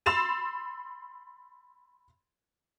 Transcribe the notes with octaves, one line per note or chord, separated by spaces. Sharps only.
B5 C6 E6 A6 E7 F7